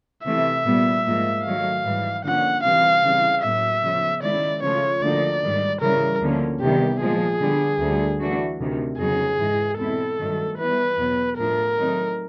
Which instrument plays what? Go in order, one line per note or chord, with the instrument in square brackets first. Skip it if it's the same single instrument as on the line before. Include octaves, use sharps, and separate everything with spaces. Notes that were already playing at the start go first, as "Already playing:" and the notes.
[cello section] C3 E3 A3 [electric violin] E5
[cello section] A#2 G3 B3
G#2 F3 A#3
[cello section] D#3 F#3 A3 [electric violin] F5
[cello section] G#2 E3 G3
[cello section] D3 F3 A#3 C#4 [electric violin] F#5
[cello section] C3 E3 G3 C4 [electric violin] F5
[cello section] C#3 E3 G3 C4
[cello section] A2 F#3 A#3 [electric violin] E5
[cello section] C#3 F3 G#3 B3
[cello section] D#3 G#3 C#4 E4 [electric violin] D5
[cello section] C#3 F3 A3 C#4 F4 [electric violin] C#5
[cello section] D2 D3 F3 A#3 D#4 [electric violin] D5
[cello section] G#2 D#3 G3
[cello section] C#3 E3 G3 [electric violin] A#4
[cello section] D2 D3 F3 A#3 C#4
[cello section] E2 C3 D#3 G3 [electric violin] G4
[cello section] A#2 F3 G#3 [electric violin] G#4
[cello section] D3 G3 B3
D2 D3 G3
E3 A3 D4 F#4
D2 C3 D#3
[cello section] F2 C#3 F#3 B3 D#4 [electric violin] G#4
[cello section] G#2 E3 G#3
[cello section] E2 B2 G#3 C4 E4 [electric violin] A4
[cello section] G2 D#3 F#3 A3
[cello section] E3 G3 B3 [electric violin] B4
[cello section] E2 B2 F#3 B3
[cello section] A2 F3 A3 D4 [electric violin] A#4
[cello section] D#3 F#3 A3 C4 D#4